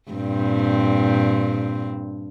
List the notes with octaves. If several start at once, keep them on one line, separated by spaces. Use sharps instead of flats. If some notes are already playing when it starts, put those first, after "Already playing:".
G2 A#2 C4